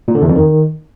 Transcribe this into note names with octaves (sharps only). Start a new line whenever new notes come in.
A#2
D3
E2
F2
D#3